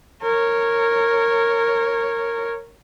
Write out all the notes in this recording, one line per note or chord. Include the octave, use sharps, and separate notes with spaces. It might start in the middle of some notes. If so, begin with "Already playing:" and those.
A#4 C#5